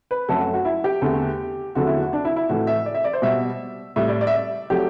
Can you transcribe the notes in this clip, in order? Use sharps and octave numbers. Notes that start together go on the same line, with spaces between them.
B4
F#2 F#3 A3 A4
F#4
F#4
E4
G4
E2 D3 A3
E2 D3 F#3 A3 F#4
E4
F#4
D4
E4
E4
A2 E3 A3 F#4
E5
D5
E5
D5
C5
B2 G3 E5
A2 G3 E5
D5
D5
E5
D5
F#3 A3 G4